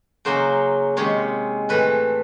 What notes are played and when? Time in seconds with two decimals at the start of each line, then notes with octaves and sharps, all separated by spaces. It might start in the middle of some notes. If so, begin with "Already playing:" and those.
0.25 C#3 F#3 A#3 C#4 C5
0.97 C3 D#3 G#3 C#4 C#5
1.69 A2 E3 A3 C4 B4